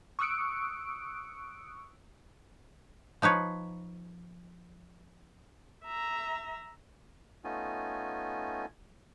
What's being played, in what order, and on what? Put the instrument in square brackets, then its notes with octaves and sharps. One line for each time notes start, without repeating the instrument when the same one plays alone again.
[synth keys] C#6 D#6 E6 F#6 C#7 D7
[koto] F3 D#4 B4 C#5
[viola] E5 A#5
[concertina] A3 B3 C#4 D#4 F4 G#5